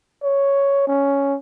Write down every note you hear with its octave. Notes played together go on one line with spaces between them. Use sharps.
C#5
C#4